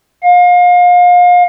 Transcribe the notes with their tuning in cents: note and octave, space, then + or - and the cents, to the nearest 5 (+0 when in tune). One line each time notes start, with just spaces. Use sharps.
F5 +35